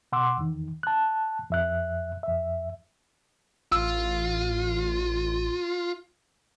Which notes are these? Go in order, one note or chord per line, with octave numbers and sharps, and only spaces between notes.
B2 F#5 C6 D6 E6
E2 D#3
A5 F#6
F2 E5 F#6
F2 E5
A1 F4 E6